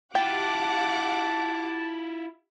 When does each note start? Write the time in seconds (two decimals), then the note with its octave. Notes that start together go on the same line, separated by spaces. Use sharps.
0.15 E4 F4 G4 F#5 G5 A5 D6